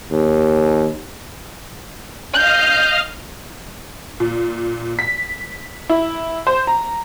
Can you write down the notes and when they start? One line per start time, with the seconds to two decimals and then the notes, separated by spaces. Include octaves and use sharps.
0.11 D#2
2.34 D#5 F5 F6 G6
4.20 A#2
4.99 B6
5.89 E4
6.47 C5
6.67 A#5